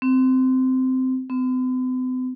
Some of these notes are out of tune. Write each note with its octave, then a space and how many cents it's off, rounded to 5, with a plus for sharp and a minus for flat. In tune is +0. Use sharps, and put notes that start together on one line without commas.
C4 -15
C4 -45